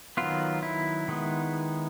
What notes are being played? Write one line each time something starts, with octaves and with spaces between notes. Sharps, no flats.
D#3 F#3 B3 F4
E4
D#3 G#3 B3